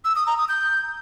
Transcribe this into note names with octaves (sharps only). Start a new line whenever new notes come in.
E6
D#6
A#5
D#6
G6